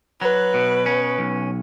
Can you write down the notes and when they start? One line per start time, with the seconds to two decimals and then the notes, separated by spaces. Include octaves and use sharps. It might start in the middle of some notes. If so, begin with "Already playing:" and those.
0.22 F#3 B4
0.54 B2
0.86 C#4
1.19 B1